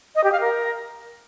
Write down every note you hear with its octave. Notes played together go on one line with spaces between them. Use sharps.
D#5
G4
F5
A#4